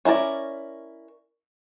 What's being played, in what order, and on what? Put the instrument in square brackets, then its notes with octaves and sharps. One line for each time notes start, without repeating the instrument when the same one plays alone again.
[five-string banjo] C#4 E4 A#4 D5